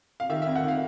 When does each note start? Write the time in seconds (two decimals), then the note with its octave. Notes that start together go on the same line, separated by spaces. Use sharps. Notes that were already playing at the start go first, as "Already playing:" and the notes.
0.20 F5
0.29 D#3 E5
0.42 E5
0.47 F2
0.56 F#5
0.64 D#3 F5